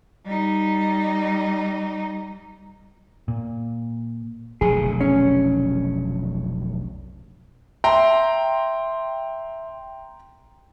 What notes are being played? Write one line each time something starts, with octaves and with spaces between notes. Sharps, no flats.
G3 D#4
A#2
F1 B1 D3 G#4
C#4
E5 G5 A#5 C6